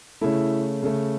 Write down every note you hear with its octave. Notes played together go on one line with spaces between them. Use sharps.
C#3 A3 E4
C#3 A3